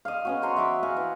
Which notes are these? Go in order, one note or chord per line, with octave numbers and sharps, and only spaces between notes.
D#5 F5
B3 C#4 F#4
C5 C#5 A#5 C6
E5 C6 D6
F5 F#5 G#5
E3